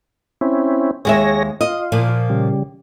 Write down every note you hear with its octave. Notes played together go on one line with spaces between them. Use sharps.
C4 C#4 E4
D#2 G#3 G#4 C#5 E5 A#6
F4 D#5
A#2 F3 A#3
C#3 G3